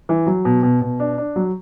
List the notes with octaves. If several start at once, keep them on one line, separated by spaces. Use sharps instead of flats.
E3
F#3
B2
B2
B2
D4
D4
F#3